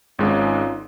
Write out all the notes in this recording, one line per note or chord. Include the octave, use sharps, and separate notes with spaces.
G#1 G#2 G#3 C#4 D#4 F4